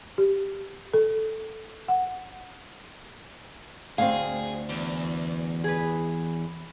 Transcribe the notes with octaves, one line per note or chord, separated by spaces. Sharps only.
G4
A4
F#5
D2 C4 G#4 F5
E2
G#4 B4